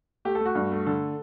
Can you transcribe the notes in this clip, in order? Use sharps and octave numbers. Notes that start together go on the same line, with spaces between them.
A3 G4
A4
A3
F#4
G2
A3
D3 A4